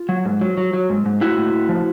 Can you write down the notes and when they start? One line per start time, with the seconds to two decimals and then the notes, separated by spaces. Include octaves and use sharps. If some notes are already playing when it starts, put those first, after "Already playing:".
Already playing: F4
0.09 F#3
0.25 G#2
0.41 F#3
0.57 F#3
0.74 F#3
0.90 G#2
1.06 G#2
1.21 A2 E4 F#4
1.38 A2
1.53 A2
1.69 F3